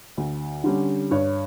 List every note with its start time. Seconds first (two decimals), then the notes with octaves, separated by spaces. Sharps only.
0.17 D2
0.64 D3 G3 C#4
1.11 G2 C#5